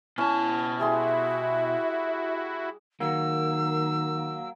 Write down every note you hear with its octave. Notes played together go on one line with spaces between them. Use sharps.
B2 C#4 E4 A5
G3 E4 F#4 G#4 E5 C6
D#3 F#3 A#3 E6